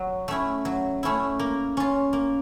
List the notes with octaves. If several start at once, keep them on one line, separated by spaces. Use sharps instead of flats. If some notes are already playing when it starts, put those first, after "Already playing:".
Already playing: F#3
A3 C#4 E4
F#3
A3 C#4 E4
A#3
C#4 F4
A#3